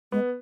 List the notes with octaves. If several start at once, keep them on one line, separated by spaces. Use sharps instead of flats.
G#3 B3